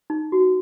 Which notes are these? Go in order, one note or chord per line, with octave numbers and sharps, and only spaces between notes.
D#4
F#4